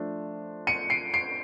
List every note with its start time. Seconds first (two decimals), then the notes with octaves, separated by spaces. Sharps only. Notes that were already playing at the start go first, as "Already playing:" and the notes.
Already playing: F3 A3 D4
0.67 C#7 D#7
0.90 C7 D7
1.14 C7 D7